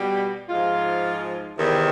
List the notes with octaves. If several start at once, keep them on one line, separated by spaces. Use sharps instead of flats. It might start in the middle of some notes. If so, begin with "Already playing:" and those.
Already playing: B2 G3
G#2 F3 G#3 F4
E2 C3 D#3